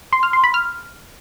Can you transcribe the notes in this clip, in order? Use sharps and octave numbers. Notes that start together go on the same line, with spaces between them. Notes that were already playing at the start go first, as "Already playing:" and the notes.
C6
F6
C6
B5
F6